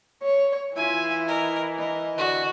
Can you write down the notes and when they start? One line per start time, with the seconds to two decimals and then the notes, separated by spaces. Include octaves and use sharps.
0.22 C#5
0.77 E3 E4 F4 E5 G#5
1.28 A#4 D#5
1.78 A#4 D#5
2.18 D3 F#4